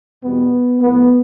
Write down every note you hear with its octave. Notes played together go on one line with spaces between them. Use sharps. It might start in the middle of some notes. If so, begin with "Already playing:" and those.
E2 B2 G3 B3
A2 F3 B3